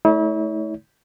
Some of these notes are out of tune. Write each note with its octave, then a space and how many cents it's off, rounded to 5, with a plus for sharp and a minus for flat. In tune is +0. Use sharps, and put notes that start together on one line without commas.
A3 -20 E4 -40 C#5 +30